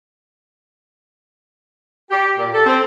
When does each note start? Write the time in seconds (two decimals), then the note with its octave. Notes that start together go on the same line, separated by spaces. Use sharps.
2.11 G4
2.38 A#2
2.54 A4
2.67 C4